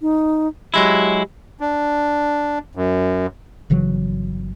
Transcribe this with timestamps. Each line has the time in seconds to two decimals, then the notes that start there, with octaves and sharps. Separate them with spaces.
0.01 D#4
0.74 F#3 G#3 E4 G4
1.60 D4
2.75 F#2
3.70 G1 C#3 E3 F#3